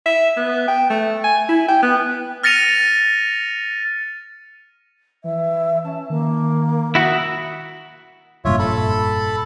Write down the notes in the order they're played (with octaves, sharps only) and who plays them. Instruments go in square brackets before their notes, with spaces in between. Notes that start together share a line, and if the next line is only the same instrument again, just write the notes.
[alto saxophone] E5
B3
G5
A3
G#5
E4
G5
B3
[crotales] F6 A6 A#6 C#7 D#7 F7
[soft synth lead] E3 [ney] E5
[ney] C#4 [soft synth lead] A5
[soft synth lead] D#3 [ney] A#3
[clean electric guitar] E4 F#4 [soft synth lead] D#6
[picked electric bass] F1 G2 A#2 [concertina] F4 C#5 E5
[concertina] A4 A5 B5